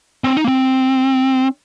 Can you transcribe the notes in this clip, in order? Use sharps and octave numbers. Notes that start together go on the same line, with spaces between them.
C4
D#4
A#3
C4